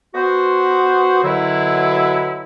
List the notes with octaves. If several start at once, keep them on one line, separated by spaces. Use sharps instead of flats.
B3 F#4 C5
F#2 B2 D3 F#3 E4